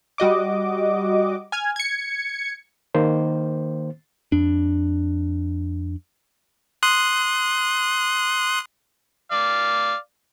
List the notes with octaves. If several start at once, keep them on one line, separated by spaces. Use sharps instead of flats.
G3 F#4 D#5 D6
G#5 F6 G#6
G#6 C#7
D#3 A#3 C5
F2 D4
C6 D#6 F#6
D5 F5